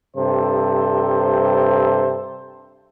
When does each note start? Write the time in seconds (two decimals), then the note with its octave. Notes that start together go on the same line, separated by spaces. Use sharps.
0.16 G2 C3 A4 C5